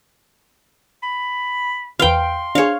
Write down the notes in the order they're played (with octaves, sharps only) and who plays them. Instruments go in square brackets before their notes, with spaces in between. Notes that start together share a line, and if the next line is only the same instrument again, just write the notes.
[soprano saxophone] B5
[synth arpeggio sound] E2 B4 F6 [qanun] F5 G5 [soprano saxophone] C6
[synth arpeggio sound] D4 G#4 [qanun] C#5 F5